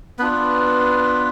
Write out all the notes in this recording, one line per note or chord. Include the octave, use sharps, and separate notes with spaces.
B3 D4 F4 B4